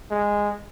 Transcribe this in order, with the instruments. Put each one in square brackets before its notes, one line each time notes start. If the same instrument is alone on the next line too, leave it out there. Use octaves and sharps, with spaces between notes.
[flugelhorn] G#3